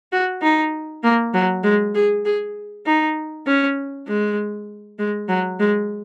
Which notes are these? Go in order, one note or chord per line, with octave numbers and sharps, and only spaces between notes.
F#4
D#4
A#3
F#3
G#3
G#4
G#4
D#4
C#4
G#3
G#3
F#3
G#3